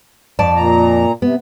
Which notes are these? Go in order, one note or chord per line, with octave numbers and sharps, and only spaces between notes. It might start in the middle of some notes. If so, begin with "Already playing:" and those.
F2 D5 A5
A#2 A#5
C3 B3